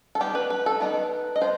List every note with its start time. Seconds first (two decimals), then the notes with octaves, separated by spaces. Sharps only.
0.15 A4
0.20 D#3 G3 B3 D#4 G4
0.35 B4
0.50 B4
0.66 A4
0.80 D#3 G3 B3 D#4 B4
1.36 D#5
1.41 D#3 B3 C5